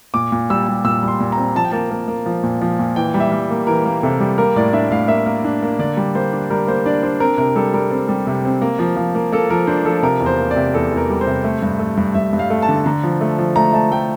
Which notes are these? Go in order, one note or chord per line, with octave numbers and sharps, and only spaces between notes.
A#2 D6
A#2
G3 E6
G3
A#2 E6
G3
C6
A#2
C4 A#5
F3 A5
G5
A#3 A5
A#3
A#3
F3
A#2
F3
A#2
E3 G5
G3
E5
G3
A#3
E3 A#4
A#3
C3 A4
G3
A#3 A#4
A2 D5
D4 E5
A2 F5
A#3 E5
A#3
D4
A#3
D3 D5
G3
A#3 C5
D4
G3 A#4
A#3 C5
D4 D5
D4 C5
C4 A#4
C3 A#4
G3 A4
G3 A#4
C4
G3
C3
C4
A#3
F3
F3
A#3
A#3 A4
F3 A#4
D4 C5
F3 A4
C3 A#4
E2
C5
A#3
D5
C3
E2 A4
E2
A#4
G3
C5
C3
A3
G2
A3
G2
G2 E5
G2
F5
A3
A5
D3
D3 A#5
F3
A3
F3
A3 A#5
A3 A5
A3 G5